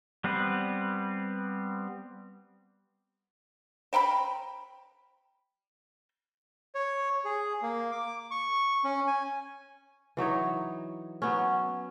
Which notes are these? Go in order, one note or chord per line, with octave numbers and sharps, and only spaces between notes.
G3 B3 C4 B4
C5 G5 A#5 B5
C#5
G#4
A#3
D6
C#6
C#4
G#5
E3 F#3 D#4 C#5
F#3 B3 C#4